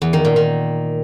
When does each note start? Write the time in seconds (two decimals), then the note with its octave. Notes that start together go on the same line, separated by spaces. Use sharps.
0.02 E2
0.13 D#3
0.25 A#2
0.36 D#3